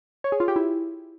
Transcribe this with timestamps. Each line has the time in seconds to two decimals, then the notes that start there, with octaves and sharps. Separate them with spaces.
0.24 C#5
0.32 G#4
0.40 F4
0.48 G4
0.56 E4